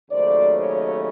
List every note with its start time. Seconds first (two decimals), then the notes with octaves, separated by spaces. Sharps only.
0.10 D#2 C#3 F#3 A3 C5 D5
0.56 C#5 D#5